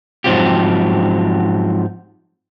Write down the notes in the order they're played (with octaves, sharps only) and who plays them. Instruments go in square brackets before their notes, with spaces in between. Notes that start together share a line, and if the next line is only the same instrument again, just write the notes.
[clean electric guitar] G#2 F3 F#3 C4 F4 G4